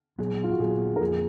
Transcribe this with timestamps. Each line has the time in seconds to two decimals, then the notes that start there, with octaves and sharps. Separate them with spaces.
0.18 A#2 F#3 B3 G#4
0.44 F4
0.51 F#4
0.60 A#2 F#3 B3 G#4
0.96 A#4
1.01 F2 F3 A#3 G#4